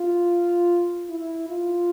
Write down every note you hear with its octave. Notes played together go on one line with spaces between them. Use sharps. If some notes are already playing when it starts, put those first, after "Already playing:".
Already playing: F4
E4
F4